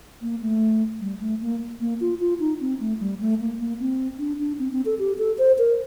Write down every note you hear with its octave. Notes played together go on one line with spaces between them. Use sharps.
A#3
A3
G3
A3
A#3
A#3
F4
F4
D#4
C4
A3
G3
A3
A#3
A#3
C4
D4
D4
C4
C4
A4
G4
A4
C5
A#4